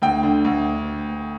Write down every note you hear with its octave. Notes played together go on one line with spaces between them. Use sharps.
D2 G5
D3
D2